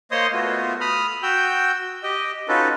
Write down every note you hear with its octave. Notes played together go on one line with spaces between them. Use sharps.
A#3 C5 C#5 D#5 C6 D#6
A3 B3 F4 F#4
B5 D#6 F6
F#4 G5 E6 G6
G4 D#5 G5
C#4 D#4 F4 F#4 A4 B4